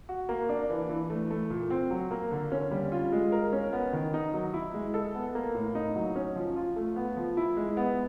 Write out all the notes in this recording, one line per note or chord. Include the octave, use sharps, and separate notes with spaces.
F#4
A#3
D4
E3
E3
A3
A3
A#2
C4
F#3
A#3
D3
C#4
G3
F4
G#3
A#4
C#4
B3
D#3
D#4
F#3
E4
G#3
A4
B3
A#3
A2
D#4
F#3
C#4
F3
F4
A3
B3
F3
E4
G#3
B3